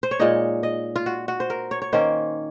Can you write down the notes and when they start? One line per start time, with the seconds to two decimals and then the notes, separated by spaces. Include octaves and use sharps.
0.03 C5
0.11 C#5
0.19 A#2 G#3 D#4 D#5
0.63 D#5
0.96 F4
1.06 F#4
1.28 F#4
1.40 C5
1.50 A#4
1.71 C#5
1.82 C#5
1.93 D#3 A#3 C#4 C5